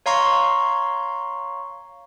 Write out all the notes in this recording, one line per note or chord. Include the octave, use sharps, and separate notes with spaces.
C#5 F5 A#5 C6 C#6